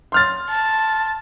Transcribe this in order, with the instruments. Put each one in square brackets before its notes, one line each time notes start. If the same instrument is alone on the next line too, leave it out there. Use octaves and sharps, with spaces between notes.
[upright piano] C6 F6 A6
[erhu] A5